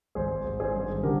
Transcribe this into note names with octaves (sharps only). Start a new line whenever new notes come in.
G#1 G#4 C5
G#1
G#4 C5
G2
D3 G4 A#4